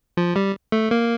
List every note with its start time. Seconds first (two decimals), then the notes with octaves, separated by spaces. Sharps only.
0.17 F3
0.36 G3
0.72 A3
0.91 A#3